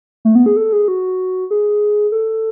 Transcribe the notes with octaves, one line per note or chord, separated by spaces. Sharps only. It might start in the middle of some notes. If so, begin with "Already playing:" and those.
A3
B3
G#4
A4
G#4
F#4
G#4
A4